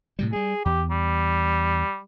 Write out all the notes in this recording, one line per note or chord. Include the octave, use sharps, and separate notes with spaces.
A2 C3 G3
G3 G#3 G#4
E2 G4
G3